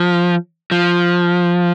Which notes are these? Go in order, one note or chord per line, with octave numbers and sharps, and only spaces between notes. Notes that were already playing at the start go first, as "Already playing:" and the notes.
Already playing: F3
F3